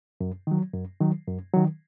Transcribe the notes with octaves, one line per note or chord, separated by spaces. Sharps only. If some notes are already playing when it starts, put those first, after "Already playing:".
F#2
D#3 F#3
F#2
D#3 F#3
F#2
D#3 F#3